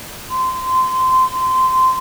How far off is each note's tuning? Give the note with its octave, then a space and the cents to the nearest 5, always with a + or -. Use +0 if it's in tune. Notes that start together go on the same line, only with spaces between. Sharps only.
C6 -20